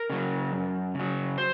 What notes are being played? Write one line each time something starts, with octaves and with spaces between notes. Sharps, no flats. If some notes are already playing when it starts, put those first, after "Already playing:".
Already playing: A#4
C#3 F#3
F#2
C#3
F#3
C5